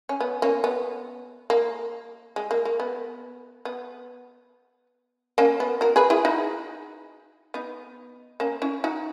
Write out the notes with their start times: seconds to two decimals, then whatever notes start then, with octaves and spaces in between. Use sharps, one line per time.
0.09 C#4
0.20 B3
0.42 A#3 C#4
0.64 B3
1.50 A#3
2.36 G#3
2.51 A#3
2.65 A#3
2.80 B3
3.65 B3
5.38 A#3 C#4
5.60 B3
5.81 F#4 A#4
5.96 G#4 B4
6.10 E4 G#4
6.25 D#4 F#4
7.54 B3 D#4
8.40 A#3 C#4
8.62 C#4 E4
8.84 D#4 F#4